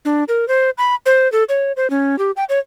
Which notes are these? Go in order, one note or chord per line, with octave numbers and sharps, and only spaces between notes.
D4
A#4
C5
B5
C5
A4
C#5
C5
C#4
G4
G5
C#5